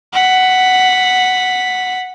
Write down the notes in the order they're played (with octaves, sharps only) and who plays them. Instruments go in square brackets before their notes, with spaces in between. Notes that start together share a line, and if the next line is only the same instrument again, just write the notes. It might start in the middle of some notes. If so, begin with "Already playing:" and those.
[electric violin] F#5 B6